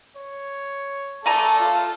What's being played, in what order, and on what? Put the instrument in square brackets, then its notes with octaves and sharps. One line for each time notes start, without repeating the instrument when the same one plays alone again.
[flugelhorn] C#5
[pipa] A3 G#5 A#5 [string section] A4 [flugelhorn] D5
[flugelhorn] F4